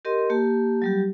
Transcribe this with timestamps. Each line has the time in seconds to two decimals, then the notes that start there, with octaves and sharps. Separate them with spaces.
0.05 G4 A#4 D#5 C6
0.30 A#3 G4 A5
0.82 F#3 G3 G4